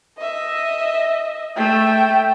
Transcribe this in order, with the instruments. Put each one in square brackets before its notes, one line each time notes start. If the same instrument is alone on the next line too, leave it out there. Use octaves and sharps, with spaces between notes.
[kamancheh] D#5 E5
[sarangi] A3 [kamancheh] G5